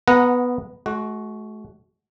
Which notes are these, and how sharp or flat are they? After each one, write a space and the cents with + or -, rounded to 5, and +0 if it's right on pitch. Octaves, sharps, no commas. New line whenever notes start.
B3 +0 F#5 -20 A#5 +0
A3 -45 F#4 +5